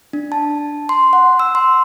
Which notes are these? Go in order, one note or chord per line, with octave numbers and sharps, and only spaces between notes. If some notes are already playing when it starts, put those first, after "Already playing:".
D4
A5
C6
F#5
E6
C6